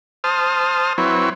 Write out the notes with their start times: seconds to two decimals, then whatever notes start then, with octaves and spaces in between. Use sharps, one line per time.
0.24 C5 A5 D#6 F6
0.98 F#3 C4 E4 B4 C#5